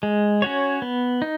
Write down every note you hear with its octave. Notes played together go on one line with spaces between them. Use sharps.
G#3
C#4 F#4 C#5
B3
D#4